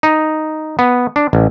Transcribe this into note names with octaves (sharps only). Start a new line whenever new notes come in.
D#4
B3
D4
A1